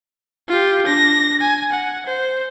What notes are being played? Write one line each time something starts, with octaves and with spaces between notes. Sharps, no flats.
F4 G4
D4 A#6
G#5
F#5
C5